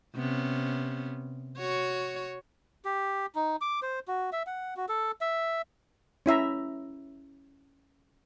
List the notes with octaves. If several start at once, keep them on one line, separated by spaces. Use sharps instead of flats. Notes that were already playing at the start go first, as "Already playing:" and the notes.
C3 B3 C#4
F#4 C#5
G4
D#4
D6
C5
F#4
E5
F#5
F#4
A4
E5
C#4 E4 E5 A#5